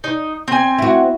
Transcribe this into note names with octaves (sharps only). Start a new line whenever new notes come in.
D#4
C4 G#5
E4 F#4